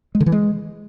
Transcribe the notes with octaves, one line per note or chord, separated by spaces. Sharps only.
G#3
D3
E3
G#3